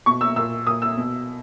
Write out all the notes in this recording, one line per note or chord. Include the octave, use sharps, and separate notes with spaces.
B2 C#6
E6
A#2 E6
A#2 D#6
E6
B2